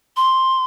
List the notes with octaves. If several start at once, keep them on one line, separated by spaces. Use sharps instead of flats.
C6